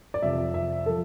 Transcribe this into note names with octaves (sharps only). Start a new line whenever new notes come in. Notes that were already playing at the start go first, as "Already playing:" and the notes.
D5
F2 C3 F3 E5
E5
F3 A4